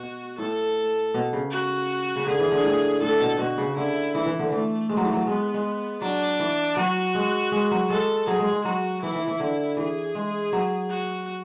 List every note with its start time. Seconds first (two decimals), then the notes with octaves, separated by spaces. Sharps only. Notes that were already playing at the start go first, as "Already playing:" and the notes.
Already playing: B2 F#4
0.38 A2 A4
1.14 B2
1.33 C#3
1.51 F#4
2.16 C#3
2.27 D3 G#4
2.39 E3
2.52 D3
2.64 A2
3.01 A2 A4
3.20 B2
3.39 B2 F#4
3.58 C#3
3.77 D3 E4
4.15 E3 E4
4.26 E3
4.39 D3
4.51 E3 A3
4.89 G#3
4.97 F#3
5.05 E3
5.13 F#3
5.27 G#3 B3
5.54 G#3
6.02 F#3 D4
6.40 E3
6.77 F#3 F#4
7.15 G#3
7.52 G#3
7.71 F#3
7.90 G#3 A4
8.27 F#3 G#4
8.40 G#3
8.52 G#3
8.65 F#3 F#4
9.02 E3 E4
9.15 E3
9.28 E3
9.40 D3
9.77 E3 G#4
10.15 G#3
10.53 F#3
10.90 F#4